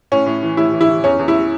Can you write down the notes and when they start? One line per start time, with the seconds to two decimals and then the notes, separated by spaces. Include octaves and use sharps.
0.12 A2 C#4
0.26 A2
0.43 E3
0.57 A2 E4
0.73 E3
0.81 E4
0.89 E3
1.04 E2 C#4
1.19 E2
1.28 E4